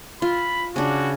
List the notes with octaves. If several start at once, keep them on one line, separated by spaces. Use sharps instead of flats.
F4 B5
C#3 D4 F#4